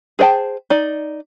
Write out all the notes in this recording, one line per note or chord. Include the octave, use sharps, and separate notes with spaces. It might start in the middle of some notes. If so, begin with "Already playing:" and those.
G#4 C5 D#5 G5 A5
D#4 D5